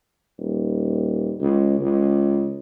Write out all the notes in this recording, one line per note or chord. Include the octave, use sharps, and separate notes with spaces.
D#1
C#2
C#2